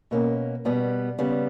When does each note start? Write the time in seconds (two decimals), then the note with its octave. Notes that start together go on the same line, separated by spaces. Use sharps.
0.11 B2 A#3 C#4
0.65 B2 G3 B3
1.19 C#3 G3 B3